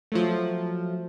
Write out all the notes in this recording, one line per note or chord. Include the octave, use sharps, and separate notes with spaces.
F3 F#3 A3